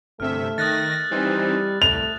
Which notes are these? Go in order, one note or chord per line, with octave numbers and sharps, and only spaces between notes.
G1 C3 A3 E5 F6
D#3 D#6 F#6 A6 A#6
E3 G3 C4 D#4
C2 A3 F7